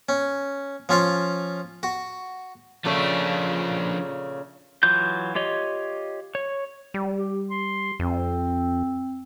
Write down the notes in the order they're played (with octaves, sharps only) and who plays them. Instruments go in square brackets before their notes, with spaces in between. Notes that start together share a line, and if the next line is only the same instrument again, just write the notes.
[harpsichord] C#4
F3 C#4 F4 F5
F#4
[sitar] A#2 C#3 A3 [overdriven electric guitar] F3 D4
[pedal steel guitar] E3 F#3 F4 G6
F4 G4 C#5 D#5
C#5
[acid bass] G3
[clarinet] G4
C6
[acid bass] F2 [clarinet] C4